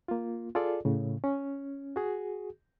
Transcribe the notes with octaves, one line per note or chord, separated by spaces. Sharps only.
A#3 F4
F4 G#4 A4 D5
A2 C#3
C#4
F#4 G#4